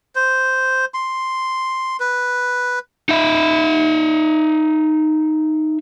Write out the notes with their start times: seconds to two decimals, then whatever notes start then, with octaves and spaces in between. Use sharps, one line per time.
0.15 C5
0.94 C6
2.00 B4
3.09 D#4 E5